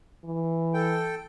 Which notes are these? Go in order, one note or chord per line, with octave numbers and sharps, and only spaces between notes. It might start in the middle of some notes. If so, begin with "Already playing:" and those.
E3
A4 G5